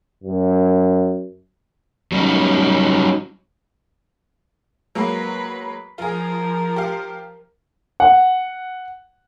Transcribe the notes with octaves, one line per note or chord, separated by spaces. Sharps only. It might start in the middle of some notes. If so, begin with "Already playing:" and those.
F#2
F#3 G3 C#4 D#4
F#3 G#3 A#3 B4
F3 F4 G#4 A#4
G4 F5
F#5